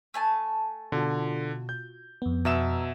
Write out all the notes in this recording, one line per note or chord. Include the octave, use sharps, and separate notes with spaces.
A3 G#5 A5
B2 D3 F4 F#4
G6
F2 B3
B2 E5 A#5 E6 E7